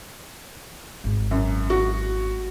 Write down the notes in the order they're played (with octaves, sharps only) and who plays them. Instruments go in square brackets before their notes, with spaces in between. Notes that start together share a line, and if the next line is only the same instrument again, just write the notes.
[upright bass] G#1
[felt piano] F#2
F#4